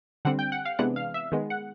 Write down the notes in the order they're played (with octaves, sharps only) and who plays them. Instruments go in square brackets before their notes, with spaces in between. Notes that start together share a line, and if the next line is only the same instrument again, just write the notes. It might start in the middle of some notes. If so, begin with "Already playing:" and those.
[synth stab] D3 G3 C4 F#5
G5
F#5
F5
C3 E3 G#3 B3 D4 F#5
F5
E5
D#3 G#3 B3
F#5